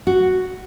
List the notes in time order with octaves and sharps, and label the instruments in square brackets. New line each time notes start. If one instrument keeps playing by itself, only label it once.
[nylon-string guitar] F#4